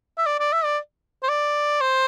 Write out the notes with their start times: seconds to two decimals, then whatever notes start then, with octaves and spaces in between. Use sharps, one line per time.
0.18 E5
0.26 D5
0.39 D5
0.53 E5
0.65 D5
1.23 C5
1.29 D5
1.81 C5